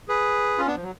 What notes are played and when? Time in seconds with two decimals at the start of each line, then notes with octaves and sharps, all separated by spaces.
0.08 G#4 B4
0.58 C#4 F4
0.67 B3 D4
0.75 F3
0.83 F#3